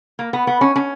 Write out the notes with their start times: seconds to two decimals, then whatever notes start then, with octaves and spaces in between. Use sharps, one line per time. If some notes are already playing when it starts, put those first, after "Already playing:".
0.19 A#3
0.33 B3
0.47 B3
0.61 C#4
0.76 C#4